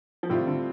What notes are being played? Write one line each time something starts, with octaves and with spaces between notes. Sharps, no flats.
F3
A2 C3 D#3 G3 C4 F4
D3